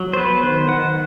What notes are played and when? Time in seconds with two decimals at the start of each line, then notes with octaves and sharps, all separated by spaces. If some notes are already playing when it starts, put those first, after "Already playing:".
Already playing: F#3
0.13 C5
0.17 B3 B4
0.43 D#3 C5
0.68 D#3 F#5